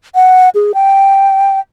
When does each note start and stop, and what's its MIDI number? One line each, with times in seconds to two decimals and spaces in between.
0.15 0.49 78
0.55 0.72 68
0.74 1.60 79